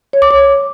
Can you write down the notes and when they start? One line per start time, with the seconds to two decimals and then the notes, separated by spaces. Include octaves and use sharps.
0.13 C#5
0.22 D6
0.31 C#5